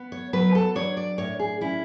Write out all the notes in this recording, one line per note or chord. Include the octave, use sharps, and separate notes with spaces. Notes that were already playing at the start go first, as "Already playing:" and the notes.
Already playing: B3
C#5
F#3 B4
A4
D4 C#5
D5
A2 C#5
G#4
C#4 E4